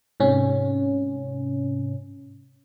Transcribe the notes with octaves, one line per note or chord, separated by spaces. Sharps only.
G#2 C3 C#4